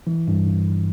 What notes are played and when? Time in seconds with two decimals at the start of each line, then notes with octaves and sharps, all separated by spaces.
0.07 E3
0.28 G2
0.47 G2
0.67 G1